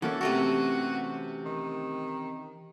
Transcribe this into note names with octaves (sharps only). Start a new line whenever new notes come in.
E3 A#3 C#4 F#4 A4
C3 A3 F#4 A#4
D#3